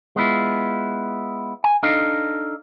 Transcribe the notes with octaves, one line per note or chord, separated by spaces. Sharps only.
G#3 B3 E4 F4
G#5
D4 D#4 A4 D#5 F5